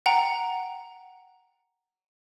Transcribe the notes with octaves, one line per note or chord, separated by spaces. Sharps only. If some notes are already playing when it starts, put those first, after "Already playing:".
F#5 G5 A#5